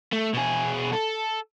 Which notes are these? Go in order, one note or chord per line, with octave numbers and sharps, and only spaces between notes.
A3
B2 G#4
A4